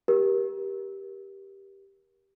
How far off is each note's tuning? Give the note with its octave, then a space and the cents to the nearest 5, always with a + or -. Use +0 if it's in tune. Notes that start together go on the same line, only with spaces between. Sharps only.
G4 +0 A#4 +30